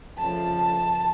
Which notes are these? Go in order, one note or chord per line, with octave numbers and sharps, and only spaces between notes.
F2 C#3 F3 A3 A5